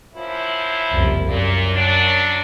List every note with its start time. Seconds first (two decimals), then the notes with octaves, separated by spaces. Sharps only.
0.14 F#2 F3 E4
0.91 F#1 C2 F2
1.27 F#2 A#2
1.73 F#3 D4